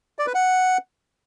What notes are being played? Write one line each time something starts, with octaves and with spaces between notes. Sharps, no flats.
D5
B4
F#5